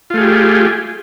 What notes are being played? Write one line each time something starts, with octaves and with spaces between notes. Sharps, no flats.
A3 F4 G4 G#4